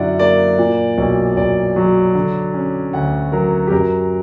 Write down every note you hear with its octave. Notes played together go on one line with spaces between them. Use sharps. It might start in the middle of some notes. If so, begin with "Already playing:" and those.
Already playing: F#2 D3 E4 D5 F#5
A#3 D5
A#2
B1
B1 D5
F#3
D3
C#4
D2 F#5
F#3 A#4
G4
F#2 A#4